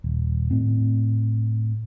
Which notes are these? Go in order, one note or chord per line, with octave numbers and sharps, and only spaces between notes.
D#1
A2 C4